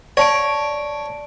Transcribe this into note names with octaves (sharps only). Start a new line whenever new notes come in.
C#5 D5 A5 D7